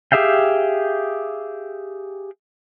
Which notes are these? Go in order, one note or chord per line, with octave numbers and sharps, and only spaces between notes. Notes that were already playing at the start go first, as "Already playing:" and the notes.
G4 G#4 E5 F5 G5